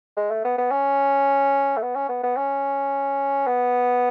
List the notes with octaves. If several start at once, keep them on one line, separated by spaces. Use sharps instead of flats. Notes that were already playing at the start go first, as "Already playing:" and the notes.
G#3
A3
B3
B3
C#4
A3
B3
C#4
B3
B3
C#4
B3